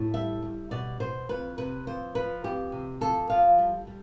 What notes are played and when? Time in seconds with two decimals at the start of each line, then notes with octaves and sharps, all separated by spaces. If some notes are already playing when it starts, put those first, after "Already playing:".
Already playing: A2
0.14 G3 E5
0.42 G3
0.71 B2 D5
1.00 B2 C5
1.29 F2 B4
1.58 C3 B4
1.87 F2 C5
2.15 F3 B4
2.44 F2 G4
2.72 C3
3.01 F2 A4
3.30 F3 F5
3.58 G3
3.87 G3